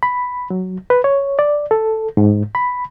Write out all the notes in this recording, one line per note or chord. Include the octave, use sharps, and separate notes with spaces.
B5
F#3
B4
C#5
D5
A4
G#2
B5